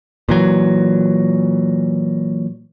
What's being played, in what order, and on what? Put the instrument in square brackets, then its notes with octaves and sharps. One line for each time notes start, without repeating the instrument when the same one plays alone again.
[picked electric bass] A#2 E3 F#3